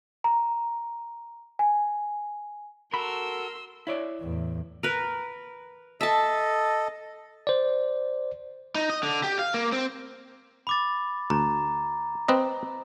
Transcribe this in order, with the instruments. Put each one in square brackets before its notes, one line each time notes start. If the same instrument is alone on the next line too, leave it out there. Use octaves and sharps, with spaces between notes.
[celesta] A#5
G#5
[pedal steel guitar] F#4 A4 [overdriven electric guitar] A#4 [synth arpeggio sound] B5 [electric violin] C6 E6
[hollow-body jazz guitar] E4 C#5 D5
[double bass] E2 A2
[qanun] A#4 B4
[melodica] A4 D#5 [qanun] E5 A5
[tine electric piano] C5 D5
[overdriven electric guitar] D#4
D#5
D3
G4
F5
A#3
C4
[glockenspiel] B5 D6 A6
[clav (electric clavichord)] D2 [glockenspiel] A#5
[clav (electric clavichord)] C4 B4 D#5